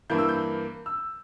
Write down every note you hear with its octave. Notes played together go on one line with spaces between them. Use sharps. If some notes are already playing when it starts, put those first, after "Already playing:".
G2 E3 A#3 G6
E6
G6
E6